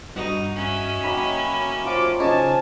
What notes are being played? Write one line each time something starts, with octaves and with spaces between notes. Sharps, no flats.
G2 D#4 F#4 D#5 F#5
C#4 E5
D#3 F#3 A#3 B5
F3 F#3 F4 D6
C#3 F3 D#4 C#5 G#5 A5